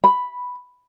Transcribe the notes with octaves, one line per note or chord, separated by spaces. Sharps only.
B5